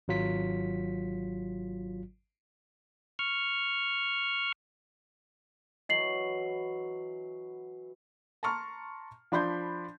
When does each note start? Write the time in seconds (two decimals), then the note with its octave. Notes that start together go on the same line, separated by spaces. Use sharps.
0.08 G#1 F#3 F4 B6
3.19 C#6 F6
5.89 E3 F#3 E4 D#5 C7 F#7
8.43 A5 A#5 C6 C#6 F6
9.32 F3 D4 B5 C6 G6